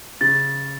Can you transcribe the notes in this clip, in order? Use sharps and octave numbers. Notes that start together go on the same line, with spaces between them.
C#3 A6